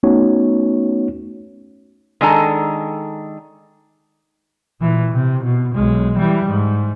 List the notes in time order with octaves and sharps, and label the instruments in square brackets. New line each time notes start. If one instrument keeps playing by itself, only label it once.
[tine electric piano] A3 B3 C#4 D#4 F#4 C#5
[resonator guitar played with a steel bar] D#3 G#3 D4 A4 G#5 A#5
[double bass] A#2 E3
C3
B2
B1 G#3
E3 G3
G#2